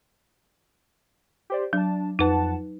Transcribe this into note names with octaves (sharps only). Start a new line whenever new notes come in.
G4 C5 D5
F#3 D4 A5
F2 D#4 B4 F#5 A5